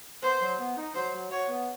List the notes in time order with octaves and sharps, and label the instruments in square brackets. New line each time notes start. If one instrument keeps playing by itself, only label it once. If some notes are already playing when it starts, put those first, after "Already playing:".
[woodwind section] B3 [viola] C5
[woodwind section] F#3
B3
D#4
[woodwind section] F#3 [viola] C5
[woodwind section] F#3
[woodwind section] F#4 [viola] C#5
[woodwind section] B3